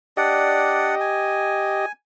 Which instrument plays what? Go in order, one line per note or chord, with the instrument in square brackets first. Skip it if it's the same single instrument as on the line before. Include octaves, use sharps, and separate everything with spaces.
[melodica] D4 D5 F#5 [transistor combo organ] G4 D#5
[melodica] G#5